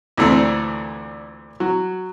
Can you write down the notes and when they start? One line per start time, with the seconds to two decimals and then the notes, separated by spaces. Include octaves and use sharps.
0.18 D2 A#2 E3 A3 C4 D4
1.60 F#3